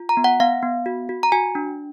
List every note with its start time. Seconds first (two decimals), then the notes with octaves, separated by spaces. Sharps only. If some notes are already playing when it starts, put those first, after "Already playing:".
Already playing: F4
0.09 A#5
0.17 B3
0.24 F#5
0.40 B3 F5
0.63 B3
0.86 F#4
1.09 F#4
1.23 A#5
1.32 F#4 G#5
1.55 D4